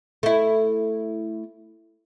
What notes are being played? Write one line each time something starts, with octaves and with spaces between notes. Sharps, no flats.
A3 E4